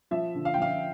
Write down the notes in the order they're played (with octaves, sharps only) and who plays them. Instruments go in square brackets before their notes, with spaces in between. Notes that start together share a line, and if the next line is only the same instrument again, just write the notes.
[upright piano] F3 E5
D3
F5
G5
F3 F5